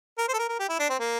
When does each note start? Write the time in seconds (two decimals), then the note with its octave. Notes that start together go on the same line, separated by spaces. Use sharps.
0.18 A#4
0.29 C5
0.34 A4
0.39 A#4
0.49 A#4
0.59 G4
0.69 E4
0.79 D4
0.90 C4
1.00 A#3